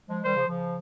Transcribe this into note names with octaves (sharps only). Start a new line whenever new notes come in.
F3 G#3
D#3 G3 C5
C#3 F3
C#3 F3